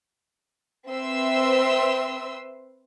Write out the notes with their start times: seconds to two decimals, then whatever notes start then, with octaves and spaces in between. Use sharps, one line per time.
0.90 C4 B4 E5 C6 E6